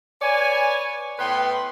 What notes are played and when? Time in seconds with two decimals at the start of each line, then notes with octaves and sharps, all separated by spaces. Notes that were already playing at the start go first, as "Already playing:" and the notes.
0.21 B4 C#5 D5 G#5
1.19 A2 B3 B4 G5 B5 C6